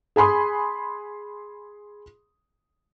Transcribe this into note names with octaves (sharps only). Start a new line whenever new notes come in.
G#4 G#5 B5 C6 D#6